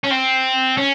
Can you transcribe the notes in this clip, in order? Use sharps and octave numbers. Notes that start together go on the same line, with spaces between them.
C#4
C4
C#4